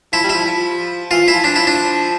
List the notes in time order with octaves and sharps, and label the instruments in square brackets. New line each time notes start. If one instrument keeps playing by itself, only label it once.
[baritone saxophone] F3 [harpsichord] E4
[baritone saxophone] G3
[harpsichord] E4
[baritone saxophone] F3
F3
[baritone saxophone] E3 [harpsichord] F4
[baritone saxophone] F3
[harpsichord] E4
[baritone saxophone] F3
[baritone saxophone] F3 [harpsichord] D4
[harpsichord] E4
D4